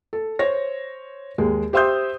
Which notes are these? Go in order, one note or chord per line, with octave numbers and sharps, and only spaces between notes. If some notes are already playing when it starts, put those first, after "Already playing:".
A4
C5 C#5 A#6
D#2 G#3
G4 C5 E5 C6 D#6 G6